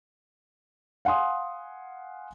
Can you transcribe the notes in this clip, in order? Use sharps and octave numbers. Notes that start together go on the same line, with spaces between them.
F5 F#5 G#5 C6 D#6